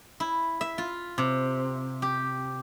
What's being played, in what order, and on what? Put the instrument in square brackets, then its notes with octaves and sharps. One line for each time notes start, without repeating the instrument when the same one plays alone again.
[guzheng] E4
E5
F4
C3
G4